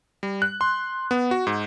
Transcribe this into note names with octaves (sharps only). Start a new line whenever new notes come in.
G3
F#6
C6
B3
F#4
G#2